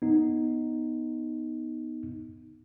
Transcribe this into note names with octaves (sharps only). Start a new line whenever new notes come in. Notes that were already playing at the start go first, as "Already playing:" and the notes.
B3 D#4